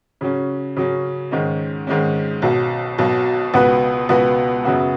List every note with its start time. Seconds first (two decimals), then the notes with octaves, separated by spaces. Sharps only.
0.21 C#3 F#3 C#4
0.76 C#3 F#3 C#4
1.31 G#2 D#3 G#3 C#4
1.87 G#2 D#3 G#3 C#4
2.42 B1 B2 F#3
2.98 B1 B2 F#3
3.54 C#2 B2 B3 F#4 B4
4.09 C#2 B2 B3 F#4 B4
4.65 F#2 C#3 B3 F#4